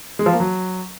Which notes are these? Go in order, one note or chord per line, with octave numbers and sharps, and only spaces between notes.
G#3
F3
A#3
F#3